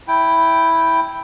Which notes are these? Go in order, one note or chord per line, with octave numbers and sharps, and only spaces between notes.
E4 G5